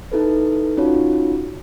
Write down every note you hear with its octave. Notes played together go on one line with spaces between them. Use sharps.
D#4 E4 A4 B4
C#4 D#4 F4 F#4 C#5